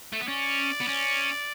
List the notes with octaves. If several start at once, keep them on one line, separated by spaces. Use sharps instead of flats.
A3
B3
C#4 D5
B3
C#4